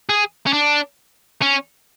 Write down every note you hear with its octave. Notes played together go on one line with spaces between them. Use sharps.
G#4
C#4
D4
C#4